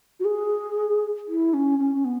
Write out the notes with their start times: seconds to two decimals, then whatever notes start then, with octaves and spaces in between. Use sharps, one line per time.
0.20 F#4
0.25 G#4
1.28 E4
1.53 C#4
1.79 C#4
1.95 C#4
2.05 B3